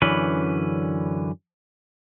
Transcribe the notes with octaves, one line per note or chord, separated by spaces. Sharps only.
F#2 D3 E3 C#4 B4